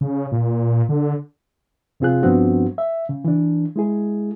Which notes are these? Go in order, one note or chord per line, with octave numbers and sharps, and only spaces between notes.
C#3
A#2
D3
F2 C3 C4 F4 G#4 F#6
G2 F3 B3 C4 D4 F#4
E5
C#3
E3 D4
G#3 E4 G#4